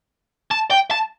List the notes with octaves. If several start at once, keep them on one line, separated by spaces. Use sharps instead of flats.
A5
G5
A5